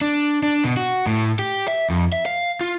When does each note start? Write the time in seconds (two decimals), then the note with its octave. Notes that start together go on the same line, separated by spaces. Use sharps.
0.01 D4
0.43 D4
0.65 B2
0.77 F#4
1.07 A2
1.39 G4
1.68 E5
1.90 F2
2.12 E5
2.26 F5
2.61 F4